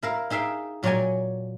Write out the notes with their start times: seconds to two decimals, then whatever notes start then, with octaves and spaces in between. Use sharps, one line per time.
0.03 E4 A#4 F5
0.30 D#4 G#4 E5 F5 G5
0.83 A#2 F#3 C#5 D5 G5 G#5